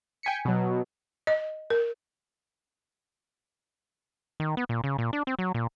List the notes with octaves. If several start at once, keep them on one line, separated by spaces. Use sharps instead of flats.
G5 G#5 B6 C#7
B2 F#3
D#5
A#4
D#3
B3
A#2
C#3
A#2
D4
C4
F#3
A#2